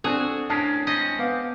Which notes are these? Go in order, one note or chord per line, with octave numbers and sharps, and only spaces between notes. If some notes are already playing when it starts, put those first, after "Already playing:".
C4 D4 F#4 G#4 A4
A2 C#4 D4 A#4 A5 D#6 C7
G#3 C4 C#4 D#5
B3 F5 D6